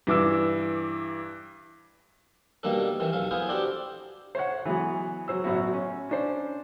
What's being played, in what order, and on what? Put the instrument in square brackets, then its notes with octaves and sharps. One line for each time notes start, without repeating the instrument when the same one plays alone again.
[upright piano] G2 E3 D6 E6
[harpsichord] B2 D#3 G3 A#3 D4 A4
C3 D#3 E3
B1 C3 A4 F5
B3 E4 G#4 C5 F5
D4 F#4 G4 A4 C5 D5
[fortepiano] C5 C#5 F#5
E3 F#3 G#3 B3
F#3 C5 E6
A1 F#3 B3 F#4
C#4
C#4 D4 C5